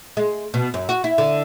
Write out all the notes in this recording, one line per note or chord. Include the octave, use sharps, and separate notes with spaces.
G#3
B2
F#2
F#4
E4
D3